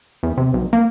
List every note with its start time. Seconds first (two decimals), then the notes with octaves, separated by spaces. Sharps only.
0.23 E2
0.37 C3
0.54 B1
0.73 A#3